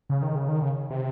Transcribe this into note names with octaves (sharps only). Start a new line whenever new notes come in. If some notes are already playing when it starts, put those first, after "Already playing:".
C#3
D#3
C#3
D#3
C#3
C3